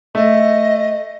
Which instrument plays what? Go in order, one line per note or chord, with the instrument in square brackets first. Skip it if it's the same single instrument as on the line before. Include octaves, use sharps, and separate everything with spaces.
[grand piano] A3 E5 [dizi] D#5